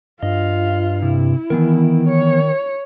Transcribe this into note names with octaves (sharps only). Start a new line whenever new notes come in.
G2 F4 D#5 F5
C3 E4
D#3 E3 B3 A#4
C#5